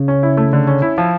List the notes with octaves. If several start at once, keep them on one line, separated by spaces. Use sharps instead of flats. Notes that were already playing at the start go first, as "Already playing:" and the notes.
Already playing: C#3
C#4
E4
A3
D3
C#4
E4
F3